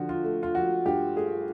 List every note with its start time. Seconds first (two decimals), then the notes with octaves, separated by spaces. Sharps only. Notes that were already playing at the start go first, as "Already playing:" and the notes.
Already playing: D3 F3 F#4
0.09 F4
0.24 A3
0.43 F4
0.55 F3 F#4
0.85 G2 G4
1.16 A3 G#4